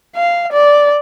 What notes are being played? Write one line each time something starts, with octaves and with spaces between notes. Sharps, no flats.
F5
D5